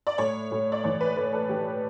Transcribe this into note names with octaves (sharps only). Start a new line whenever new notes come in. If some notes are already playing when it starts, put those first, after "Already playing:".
D5
A2 C#5
A2
D5
E3 C#5
B4
A3 B4
A4
E3 G4